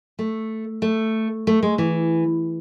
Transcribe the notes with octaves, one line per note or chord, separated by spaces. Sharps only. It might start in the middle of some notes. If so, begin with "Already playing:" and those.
A3
A3
A3
G#3
E3